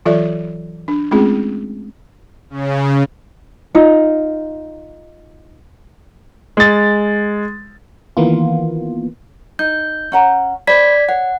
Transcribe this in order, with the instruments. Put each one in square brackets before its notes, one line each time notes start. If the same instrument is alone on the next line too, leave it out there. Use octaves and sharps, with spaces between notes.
[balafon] E3 F#3 F4 A4 D5 E5
D4
G#3 A3 C4 C#4 F4 G#4
[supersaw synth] C#3
[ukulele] D#4 F4
[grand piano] G#3 A6
[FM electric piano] D#3 E3 A#3 B3 F4
[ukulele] D#4 [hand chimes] G6
[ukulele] C#4 F#5 A#5
[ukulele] C5 B5 [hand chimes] D5 G#6 B6
[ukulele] C#5 [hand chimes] F#5